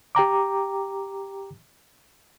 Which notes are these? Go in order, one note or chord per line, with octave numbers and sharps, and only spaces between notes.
G4 G5 A#5 D6